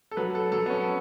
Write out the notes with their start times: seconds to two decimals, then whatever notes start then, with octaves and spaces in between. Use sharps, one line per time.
0.11 A4
0.17 F#3 B4
0.35 A4
0.52 F#3 A4
0.66 B3
0.70 C#4